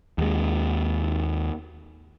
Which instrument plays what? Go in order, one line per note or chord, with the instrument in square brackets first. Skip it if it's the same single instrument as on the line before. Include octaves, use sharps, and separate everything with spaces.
[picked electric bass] D#2 G#3